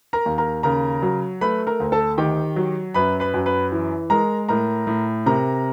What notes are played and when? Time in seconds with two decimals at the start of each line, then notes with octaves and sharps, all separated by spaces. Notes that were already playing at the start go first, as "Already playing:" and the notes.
0.13 A#4 A#5
0.26 D#2
0.38 A#4 A#5
0.63 C#3 A#4 A#5
1.02 F#3
1.41 A3 B4 B5
1.67 A#4 A#5
1.80 D2
1.92 A4 A5
2.18 D#3 G4 G5
2.56 F#3
2.94 F#2 B4 B5
3.20 B4 B5
3.34 F#2
3.46 B4 B5
3.72 E3
4.10 G#3 A#4 A#5
4.49 A2 A#4 A#5
4.87 A2
5.26 C3 A#4 A#5